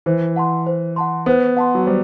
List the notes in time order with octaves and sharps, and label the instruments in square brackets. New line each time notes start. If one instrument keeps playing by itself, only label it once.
[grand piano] E3 [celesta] C5
[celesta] F#5 A5 C6
C5
F#5 A5 C6
[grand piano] B3 [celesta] C5
[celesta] F#5 A5 C6
[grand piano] F#3
[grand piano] G3 [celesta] C5